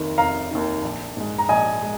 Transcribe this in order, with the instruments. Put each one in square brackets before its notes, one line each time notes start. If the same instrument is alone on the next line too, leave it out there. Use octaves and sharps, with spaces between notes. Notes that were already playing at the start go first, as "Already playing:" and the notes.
Already playing: [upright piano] F1 D#2 D#3
F1 F5 A#5
D#2 D#3
A#1
G#2 G#3
A#5
A#1 D#5 G#5
G#3